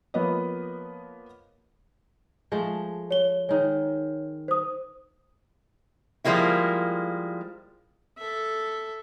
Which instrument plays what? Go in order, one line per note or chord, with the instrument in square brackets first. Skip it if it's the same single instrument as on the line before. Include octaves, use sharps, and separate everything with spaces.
[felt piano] F3 A#3 B3 B4 C#5 D#5
[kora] F3 G#3 A3
[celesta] C#5 G7
[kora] D#3 G#3 [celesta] C#5
[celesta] C5 D#6
[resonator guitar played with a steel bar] F3 G3 G#3 A#3 E4
[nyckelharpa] A4 E5